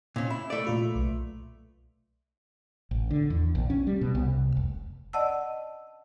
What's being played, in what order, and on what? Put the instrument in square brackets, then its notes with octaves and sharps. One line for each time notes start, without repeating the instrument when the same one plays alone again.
[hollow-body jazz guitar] A#2 C#4
[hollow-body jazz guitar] E4 [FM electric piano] B5
[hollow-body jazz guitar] A3 D5
[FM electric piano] A#2 F4
B1
[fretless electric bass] A1
D3
E2
A#1
C#4
G3
B2
C2
F1
[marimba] D5 D#5 F#5 A5 E6